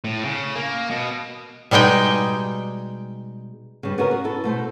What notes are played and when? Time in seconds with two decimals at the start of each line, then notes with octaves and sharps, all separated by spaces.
0.04 A2
0.25 C#3
0.56 A#3
0.91 B2
1.71 B2 G3 G#3 D#4 G5
3.83 G2 C#3
3.98 B3 C#4 F#4 G#4 A#4
4.11 F#4
4.24 E4 A4
4.44 B2 A3 C5